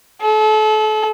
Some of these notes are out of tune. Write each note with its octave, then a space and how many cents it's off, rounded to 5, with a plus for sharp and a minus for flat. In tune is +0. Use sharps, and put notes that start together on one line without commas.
A4 -35